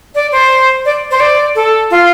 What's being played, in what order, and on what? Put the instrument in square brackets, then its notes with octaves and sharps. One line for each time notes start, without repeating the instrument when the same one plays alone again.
[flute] D5
C5
D5
C5
D5
A4
F4